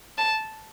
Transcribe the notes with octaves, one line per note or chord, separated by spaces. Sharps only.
A5